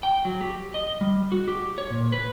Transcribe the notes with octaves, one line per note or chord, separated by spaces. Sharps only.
G5
F#3
G4
D#5
G3
F#4
G4
C#5
A#2
B4